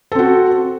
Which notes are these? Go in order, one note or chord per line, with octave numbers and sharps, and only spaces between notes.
C4 F#4 A4